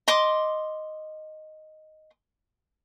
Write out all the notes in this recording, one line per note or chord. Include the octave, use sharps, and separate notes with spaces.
D#5 C6 D6